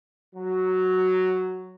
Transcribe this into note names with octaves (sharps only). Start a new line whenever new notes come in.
F#3